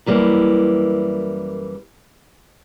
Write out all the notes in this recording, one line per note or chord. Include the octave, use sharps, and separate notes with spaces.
F#2 E3 G3 A#3